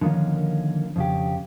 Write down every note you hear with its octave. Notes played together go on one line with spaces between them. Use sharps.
D3 D#3 F3 A#3 C#4
F2 C#3 G4